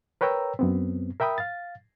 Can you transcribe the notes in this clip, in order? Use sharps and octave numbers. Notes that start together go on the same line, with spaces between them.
A#4 B4 C#5 G5 A#5 E6
F#2 B3 C4
A#4 E5 G5 B5 D#6
F5 A6